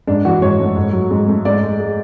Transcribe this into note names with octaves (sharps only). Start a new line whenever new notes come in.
G#2 D4
E3 F#4
G#2 C#5
A3
G#2
F#3
G#2
A3
G#2 D5
G#3
G#3